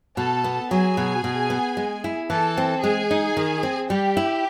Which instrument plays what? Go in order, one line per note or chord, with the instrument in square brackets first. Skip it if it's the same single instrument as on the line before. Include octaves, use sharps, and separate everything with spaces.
[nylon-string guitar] B2 [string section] A4 A5
[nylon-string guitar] B3
[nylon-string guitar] F#3 [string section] G#4 G#5
[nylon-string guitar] B2
B2
B3
G#3
E4
[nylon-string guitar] E3 [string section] A4 A5
[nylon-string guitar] C4
[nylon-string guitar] G#3 [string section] G#4 G#5
[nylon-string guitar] D#4
D#3
C4
[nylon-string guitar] G3 [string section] G4 G5
[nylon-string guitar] E4